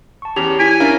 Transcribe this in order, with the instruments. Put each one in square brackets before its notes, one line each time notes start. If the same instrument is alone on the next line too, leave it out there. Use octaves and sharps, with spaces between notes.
[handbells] A5 C#6
[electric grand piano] E2 C#4 [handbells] G4 [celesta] F7
[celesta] E4 B6 D7 [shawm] G#5
[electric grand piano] C#4 E4 A#4 [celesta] D4 A6 [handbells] F5